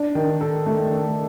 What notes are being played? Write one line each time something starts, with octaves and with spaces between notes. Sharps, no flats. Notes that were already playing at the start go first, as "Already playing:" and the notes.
Already playing: D4
D#3
A4
A3
D#3